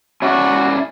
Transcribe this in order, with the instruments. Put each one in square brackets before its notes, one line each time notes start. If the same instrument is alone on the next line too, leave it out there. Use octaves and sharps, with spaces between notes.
[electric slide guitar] C#4 E4 D5 [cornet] F#4